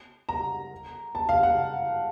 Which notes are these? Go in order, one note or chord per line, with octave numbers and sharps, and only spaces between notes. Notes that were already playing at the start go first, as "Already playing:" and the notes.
A#5
A5
F5
F#5